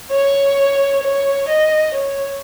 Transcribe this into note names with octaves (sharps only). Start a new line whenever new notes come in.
C#5
C#5
D#5
C#5